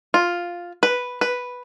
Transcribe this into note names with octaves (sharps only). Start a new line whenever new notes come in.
F4
B4
B4